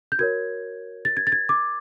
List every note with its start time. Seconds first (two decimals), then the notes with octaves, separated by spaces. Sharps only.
0.12 G6
0.19 F#4 A#4 C#5 G#6
1.05 A6
1.17 G#6
1.27 A6
1.32 G#6
1.49 D6